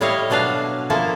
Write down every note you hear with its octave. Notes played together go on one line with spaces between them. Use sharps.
A2 G3 E4 C#5 D#5 F5
B2 F#3 D4 B4 F5
F3 A#3 E4 A4